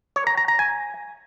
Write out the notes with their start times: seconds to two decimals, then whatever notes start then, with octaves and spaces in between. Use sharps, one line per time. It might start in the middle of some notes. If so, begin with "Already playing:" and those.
0.16 C#5
0.27 A#5
0.37 A#5
0.48 A#5
0.59 G#5